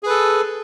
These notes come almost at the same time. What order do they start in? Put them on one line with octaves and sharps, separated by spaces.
G#4 B4 A4